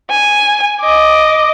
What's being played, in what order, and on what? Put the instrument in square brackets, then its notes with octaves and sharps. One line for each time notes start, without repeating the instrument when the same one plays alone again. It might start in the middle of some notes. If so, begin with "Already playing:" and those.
[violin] G#5
D#5 D6